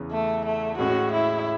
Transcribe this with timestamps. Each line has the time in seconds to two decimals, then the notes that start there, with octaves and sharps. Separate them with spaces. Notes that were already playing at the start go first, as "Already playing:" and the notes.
Already playing: E2 C#3 E3
0.12 A3
0.46 A3
0.79 A2 G#3 C#4 F#4
1.13 E4